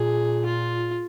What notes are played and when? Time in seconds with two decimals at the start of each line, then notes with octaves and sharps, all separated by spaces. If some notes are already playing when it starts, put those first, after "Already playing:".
Already playing: A#2 G#4
0.45 F4